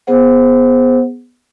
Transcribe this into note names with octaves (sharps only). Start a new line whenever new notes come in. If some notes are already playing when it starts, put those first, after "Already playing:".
B3 G#4 C5 F#5